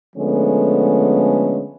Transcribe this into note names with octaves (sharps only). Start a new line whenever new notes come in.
D3 F3 G#3 A3 B3 C#4